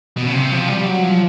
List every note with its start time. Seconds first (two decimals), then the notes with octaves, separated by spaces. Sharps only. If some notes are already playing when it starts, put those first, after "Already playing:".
0.17 B2
0.26 C#3
0.34 C3
0.52 F3
0.68 G3
0.85 F#3
1.03 F3